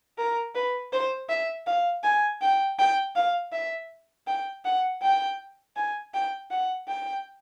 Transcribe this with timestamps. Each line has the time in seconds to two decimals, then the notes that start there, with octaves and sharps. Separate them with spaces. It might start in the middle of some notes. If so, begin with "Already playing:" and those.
0.18 A#4
0.55 B4
0.93 C5
1.29 E5
1.66 F5
2.03 G#5
2.42 G5
2.79 G5
3.16 F5
3.52 E5
4.27 G5
4.65 F#5
5.02 G5
5.76 G#5
6.14 G5
6.51 F#5
6.88 G5